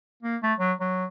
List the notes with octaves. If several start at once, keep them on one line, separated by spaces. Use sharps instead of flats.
A#3
A3
F#3
F#3